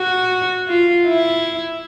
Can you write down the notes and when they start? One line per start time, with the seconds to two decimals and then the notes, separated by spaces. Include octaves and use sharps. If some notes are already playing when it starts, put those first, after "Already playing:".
Already playing: F#4
0.68 F4
1.07 E4